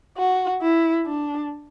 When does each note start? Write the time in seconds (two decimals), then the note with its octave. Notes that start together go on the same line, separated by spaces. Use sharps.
0.17 F#4
0.62 E4
1.06 D4